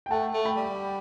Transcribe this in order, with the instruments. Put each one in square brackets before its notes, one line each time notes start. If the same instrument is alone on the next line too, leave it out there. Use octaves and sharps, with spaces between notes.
[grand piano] G5
[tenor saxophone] A3 [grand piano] F#5 A5
[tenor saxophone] A3
[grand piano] G5 B5
[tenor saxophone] G3